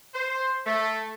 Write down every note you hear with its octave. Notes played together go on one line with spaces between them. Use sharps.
C5
A3